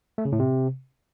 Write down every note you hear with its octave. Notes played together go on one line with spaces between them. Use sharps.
A3
C#3
A2
C3